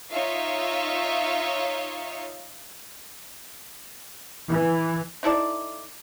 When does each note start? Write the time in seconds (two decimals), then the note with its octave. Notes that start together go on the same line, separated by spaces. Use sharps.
0.11 D#4 F4 C#5 E5 F5
4.48 E3
5.23 D#4 E4 A4 D5